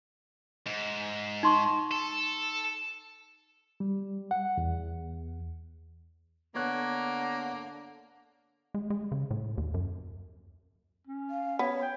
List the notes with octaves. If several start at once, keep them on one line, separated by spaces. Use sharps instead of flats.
G#2
D#4 C6 C#6
A4
G3
F#5
E2
D3 A#3 B3 C#5 F#6
G#3
G#3
C#3
A2
D#2
F#2
C#4
F5
B3 C#5
G5